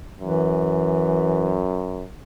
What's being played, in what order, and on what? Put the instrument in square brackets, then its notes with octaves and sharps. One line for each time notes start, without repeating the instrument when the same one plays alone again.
[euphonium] F#2 [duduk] E3